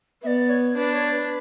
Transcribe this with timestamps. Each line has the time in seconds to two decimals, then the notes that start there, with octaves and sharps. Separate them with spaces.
0.22 B3 E5
0.26 D5
0.49 C#5
0.76 D4 B4
0.93 C#5
1.11 B4